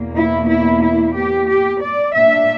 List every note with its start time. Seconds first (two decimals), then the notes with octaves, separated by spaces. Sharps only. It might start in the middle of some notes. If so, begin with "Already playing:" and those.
Already playing: E2 B2 A#3
0.17 E4
0.50 E4
0.83 E4
1.17 G4
1.49 G4
1.83 D5
2.15 A#2 A#3 D4 E5